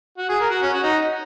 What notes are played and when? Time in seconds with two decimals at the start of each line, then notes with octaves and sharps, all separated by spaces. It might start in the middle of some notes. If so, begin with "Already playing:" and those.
0.18 F#4
0.29 G#4
0.40 A#4
0.50 F#4
0.62 C#4
0.73 F#4
0.83 D#4